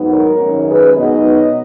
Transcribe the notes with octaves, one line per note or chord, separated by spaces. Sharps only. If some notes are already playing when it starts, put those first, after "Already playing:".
Already playing: G#2 F#3 B3 D#4
A#4 C#5
F#2 D#3 G#3 C#4
G#4 B4
B2 F#3 B3 D#4 B4 D#5